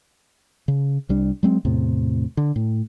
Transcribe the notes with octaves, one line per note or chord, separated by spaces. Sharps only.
C#3
C2 G3 D4
F#3 G#3 C4
E2 A2 C3
D3
A2